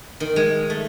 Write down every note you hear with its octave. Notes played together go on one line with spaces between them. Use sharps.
D#3
G#3
A3